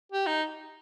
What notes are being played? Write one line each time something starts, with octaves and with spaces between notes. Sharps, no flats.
G4
D#4